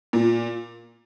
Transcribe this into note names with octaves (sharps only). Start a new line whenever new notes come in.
A#2